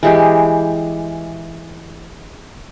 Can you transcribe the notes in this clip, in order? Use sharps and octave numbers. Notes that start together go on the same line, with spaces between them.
E3 G#3 G4